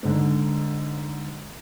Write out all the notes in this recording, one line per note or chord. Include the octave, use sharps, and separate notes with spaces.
G#2 D3